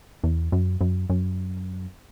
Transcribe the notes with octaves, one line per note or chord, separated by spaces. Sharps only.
E2
F#2
F#2
F#2